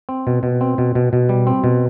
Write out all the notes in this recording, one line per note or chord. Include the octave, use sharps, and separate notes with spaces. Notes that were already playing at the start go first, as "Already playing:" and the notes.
C4
B2
B2
C4
B2
B2
B2
G3
C4
B2